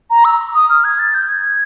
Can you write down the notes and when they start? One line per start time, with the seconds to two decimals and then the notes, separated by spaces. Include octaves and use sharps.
0.10 A#5
0.25 E6
0.55 D#6
0.69 F6
0.84 G#6
0.99 A6
1.14 G6
1.28 G#6